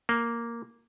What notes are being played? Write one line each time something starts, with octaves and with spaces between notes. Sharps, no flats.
A#3